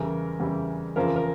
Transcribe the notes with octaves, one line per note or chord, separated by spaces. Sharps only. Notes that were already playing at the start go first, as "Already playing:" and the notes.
Already playing: E2 C#3 E3 G3 A#4
E2 C#3 E3 G3
E2 C#3 F3 A#4
A#4